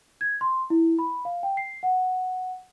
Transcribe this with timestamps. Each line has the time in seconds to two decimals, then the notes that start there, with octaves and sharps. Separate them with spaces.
0.21 G#6
0.41 C6
0.70 E4
0.99 B5
1.25 F5
1.43 G5
1.57 C7
1.83 F#5